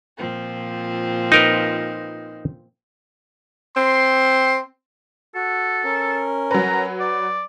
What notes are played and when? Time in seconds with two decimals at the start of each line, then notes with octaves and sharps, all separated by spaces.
0.18 A#2 F3 C4
1.32 D#4 A#4 B4
3.76 C4 C6
5.35 F#4 A4
5.84 C#4 A#4
6.51 F#3 B4 A#5
7.00 D5